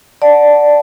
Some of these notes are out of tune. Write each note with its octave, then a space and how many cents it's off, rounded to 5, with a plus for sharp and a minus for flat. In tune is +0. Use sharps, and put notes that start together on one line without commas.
D5 +0 F#5 -15 A5 +0